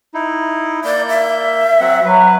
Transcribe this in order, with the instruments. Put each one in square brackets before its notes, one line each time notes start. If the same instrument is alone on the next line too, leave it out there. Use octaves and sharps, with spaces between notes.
[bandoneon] D#4 E4
[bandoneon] A#3 G6 [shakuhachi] D5
[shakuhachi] E5
[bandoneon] F#3 C4 F#5
[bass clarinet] F#3 [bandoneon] B4